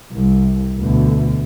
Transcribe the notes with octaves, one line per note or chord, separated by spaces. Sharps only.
C2
D2 B2